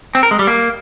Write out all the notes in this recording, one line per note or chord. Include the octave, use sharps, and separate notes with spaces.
C4
A#4
G#3
G3
A#3